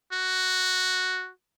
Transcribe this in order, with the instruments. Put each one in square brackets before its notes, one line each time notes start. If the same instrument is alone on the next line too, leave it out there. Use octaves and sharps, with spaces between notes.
[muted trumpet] F#4